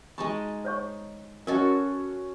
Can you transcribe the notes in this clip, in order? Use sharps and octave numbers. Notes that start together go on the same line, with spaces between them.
G#3 D#4 A5 B5 C#6
C5 C#5 C#6
C#4 F#4 A4 A#4 D#5